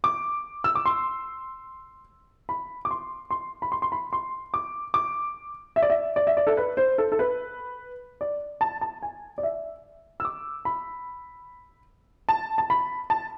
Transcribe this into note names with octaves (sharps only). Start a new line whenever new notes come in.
D6
E6
D6
C6
B5
D6
C6
C6
B5
C6
C6
B5
C6
D6
D6
E5
D5
E5
D5
E5
D5
A4
B4
C5
A4
A4
B4
D5
A5
A5
G#5
D5
E5
E6
D6
B5
A5
A5
B5
A5